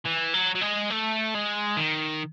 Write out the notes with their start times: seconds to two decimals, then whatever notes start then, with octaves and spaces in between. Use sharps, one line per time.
0.05 E3
0.34 F#3
0.55 F#3
0.62 G#3
0.90 A3
1.35 G#3
1.77 D#3